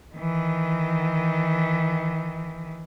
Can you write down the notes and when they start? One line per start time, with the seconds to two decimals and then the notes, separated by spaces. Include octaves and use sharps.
0.16 D#3 E3